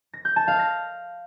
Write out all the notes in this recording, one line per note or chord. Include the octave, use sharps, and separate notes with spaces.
A#6
G6
A5
F5
A#6